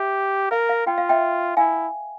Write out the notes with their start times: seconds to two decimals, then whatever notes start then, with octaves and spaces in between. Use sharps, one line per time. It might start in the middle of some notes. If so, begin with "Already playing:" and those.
Already playing: G4 E5
0.51 A#4 F5
0.69 F5
0.86 F4 G5
0.98 F5
1.09 E5 G5
1.57 E4 F5 G#5